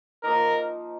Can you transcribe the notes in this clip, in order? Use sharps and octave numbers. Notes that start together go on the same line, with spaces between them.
F3 A#3 D#4 A#4